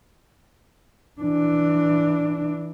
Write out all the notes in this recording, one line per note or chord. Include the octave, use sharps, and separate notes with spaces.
E3 D4